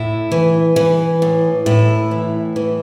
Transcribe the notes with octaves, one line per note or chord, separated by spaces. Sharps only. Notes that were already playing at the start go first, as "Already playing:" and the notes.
Already playing: A2 E4
E3
E3
A2
A2 E4
E3
E3